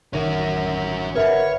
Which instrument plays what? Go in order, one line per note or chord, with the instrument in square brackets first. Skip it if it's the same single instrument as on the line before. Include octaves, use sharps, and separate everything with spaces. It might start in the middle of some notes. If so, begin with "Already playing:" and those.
[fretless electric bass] A1 D#3 [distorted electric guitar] C#4 A#4
[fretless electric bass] G1 [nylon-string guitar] A#4 E5 F#5 [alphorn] B4 [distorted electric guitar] C#5